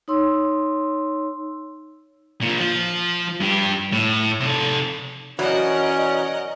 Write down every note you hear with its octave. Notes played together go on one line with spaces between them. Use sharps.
D#4 C#5 C6 E6
A#2 F3
F3
G2 G4
A2
C3 A4
E2 B2 F#3 C#4 A#4 D5 D#5 F#5